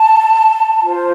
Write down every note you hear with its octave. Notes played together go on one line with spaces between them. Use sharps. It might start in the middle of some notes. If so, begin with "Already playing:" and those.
Already playing: A5
F4 C5